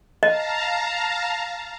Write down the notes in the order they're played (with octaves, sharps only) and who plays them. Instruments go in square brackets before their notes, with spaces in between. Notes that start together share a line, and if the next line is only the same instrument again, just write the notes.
[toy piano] D#5 [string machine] F5 A5 A#5